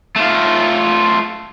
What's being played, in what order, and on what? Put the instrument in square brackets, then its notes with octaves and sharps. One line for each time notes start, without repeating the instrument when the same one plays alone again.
[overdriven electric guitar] A3 F4